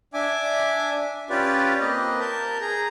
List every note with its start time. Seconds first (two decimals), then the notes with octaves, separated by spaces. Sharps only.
0.14 D4 E5 G#5 D6
1.30 C#4 F4 G4 B4 D5
1.80 A#3 C4 B4 D#5
2.20 A#4 A5 G6
2.61 G#4 A#5